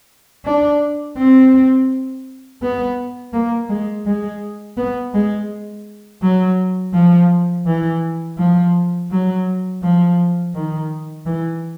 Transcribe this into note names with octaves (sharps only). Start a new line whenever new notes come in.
D4
C4
B3
A#3
G#3
G#3
B3
G#3
F#3
F3
E3
F3
F#3
F3
D#3
E3